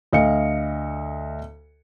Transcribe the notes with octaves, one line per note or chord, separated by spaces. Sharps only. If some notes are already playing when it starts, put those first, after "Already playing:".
D2 D#5 F5 C#7